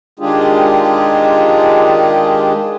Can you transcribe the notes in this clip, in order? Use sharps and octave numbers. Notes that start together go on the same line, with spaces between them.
D#3 G#3 D4 F4 G4 G#4